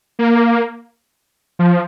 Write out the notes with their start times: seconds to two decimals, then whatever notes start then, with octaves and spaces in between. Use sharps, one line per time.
0.19 A#3
1.59 F3